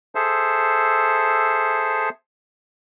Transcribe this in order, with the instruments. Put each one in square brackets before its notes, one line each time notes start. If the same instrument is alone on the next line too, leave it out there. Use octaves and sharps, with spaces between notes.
[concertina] G#4 A4 C5 E5